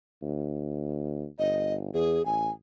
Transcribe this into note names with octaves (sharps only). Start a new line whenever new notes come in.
D2
G1 D#5
E2 G#4
A1 G#5